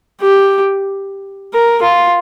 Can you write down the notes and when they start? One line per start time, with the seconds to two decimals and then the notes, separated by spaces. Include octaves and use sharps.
0.21 G4
1.53 A#4
1.82 F4